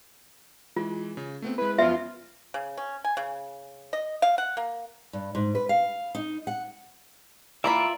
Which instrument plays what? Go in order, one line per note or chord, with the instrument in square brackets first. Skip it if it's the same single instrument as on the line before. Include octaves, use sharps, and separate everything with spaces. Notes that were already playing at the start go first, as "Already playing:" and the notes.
[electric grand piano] E3 G#3 [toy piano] F4
[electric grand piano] C#3
A3 B3 C4
[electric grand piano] G#3 E4 [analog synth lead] B4
[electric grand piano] F#2 F3 B3 [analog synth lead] F4 [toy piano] E5
[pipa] C#3
C#4
G#5
C#3
D#5
F5
F#5
A#3
[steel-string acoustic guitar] G2
G#2
B4
F5
D#4
F#5
[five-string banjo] E3 A#3 B5 [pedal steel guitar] F4 D5 E5